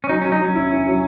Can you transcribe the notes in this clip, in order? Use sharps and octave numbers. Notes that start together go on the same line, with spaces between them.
C#4
F#3 D#4
F#3 C#4
D#4
F#3 C#4
E4
E4
F#3